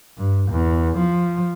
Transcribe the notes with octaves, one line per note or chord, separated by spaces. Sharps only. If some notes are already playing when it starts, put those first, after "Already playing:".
G2
E2
F3